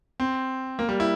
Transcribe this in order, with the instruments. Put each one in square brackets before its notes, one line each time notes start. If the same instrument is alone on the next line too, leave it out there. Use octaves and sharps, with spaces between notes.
[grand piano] C4
A#3
G3
E4